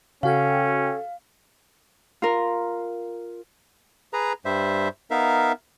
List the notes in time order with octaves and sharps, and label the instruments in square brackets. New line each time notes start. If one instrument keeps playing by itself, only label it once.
[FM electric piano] C#3 F#4 G5 [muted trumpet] C#4 [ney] A4 [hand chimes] F5
[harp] F4 A#4
[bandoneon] G#4 B4 A#5
G2 G3 C5 E5
B3 D#4 A#4 E5 F5